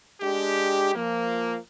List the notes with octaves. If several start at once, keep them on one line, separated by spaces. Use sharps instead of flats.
G#3 D4 G4
F3 A#3